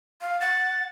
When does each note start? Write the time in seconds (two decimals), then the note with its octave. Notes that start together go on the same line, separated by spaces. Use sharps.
0.21 F5
0.41 F#5 A6